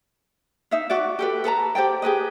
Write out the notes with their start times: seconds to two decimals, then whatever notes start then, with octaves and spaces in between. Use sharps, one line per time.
0.71 D#4 E5 F5
0.90 F#4 D5
1.19 G4 A4 B4
1.44 A4 B4 A5 A#5
1.75 G4 C5 D5 G5
2.02 G4 G#4 B4 D#5